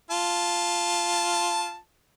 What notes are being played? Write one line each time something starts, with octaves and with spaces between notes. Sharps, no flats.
F4 A5